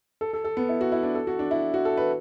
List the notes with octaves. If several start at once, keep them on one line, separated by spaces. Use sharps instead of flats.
A4
A4
A4
B3
E4
F#4
E4
D4
A4
F#4
D4
E4
F#4
A4
B4